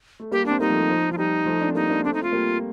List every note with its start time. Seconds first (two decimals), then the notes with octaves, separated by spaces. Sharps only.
0.20 A3
0.31 G3 A#3 G4
0.46 D4
0.51 C4
0.60 G3 A#3 D#4
0.70 F3 A3
0.79 G3
0.89 F3
1.11 F3 F4
1.18 G3 D#4
1.46 F3 A3
1.61 D4
1.68 C4
1.75 G3 A#3 D#4
1.90 A#3 D4
2.04 A3 C4 D4
2.14 D#4
2.23 A3 F4
2.33 G3 A#3